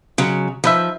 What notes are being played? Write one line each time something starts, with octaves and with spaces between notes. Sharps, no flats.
C#3 F#3 G#3
F3 D#4 B4 E5